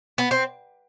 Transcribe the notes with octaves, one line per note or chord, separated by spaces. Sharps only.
B3
C4